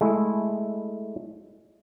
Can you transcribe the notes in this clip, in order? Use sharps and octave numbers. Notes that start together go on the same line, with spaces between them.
G#3 A3 E4